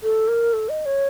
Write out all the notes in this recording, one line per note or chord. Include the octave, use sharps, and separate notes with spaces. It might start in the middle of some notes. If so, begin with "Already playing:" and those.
A4
A#4
A4
D#5
C#5